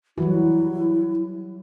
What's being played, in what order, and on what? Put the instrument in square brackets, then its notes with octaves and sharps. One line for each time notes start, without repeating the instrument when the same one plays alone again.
[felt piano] E3 [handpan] F#3 G3 F#4 [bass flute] E4